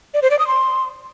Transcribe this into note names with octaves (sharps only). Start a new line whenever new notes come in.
D5
C5
D5
D#6
C6